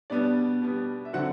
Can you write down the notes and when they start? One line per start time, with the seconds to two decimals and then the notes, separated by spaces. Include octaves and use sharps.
0.10 B2 G3 B3 D4 D5
0.62 B2 G3 B3
1.05 E5
1.13 D3 F#3 C4 F#4 F#5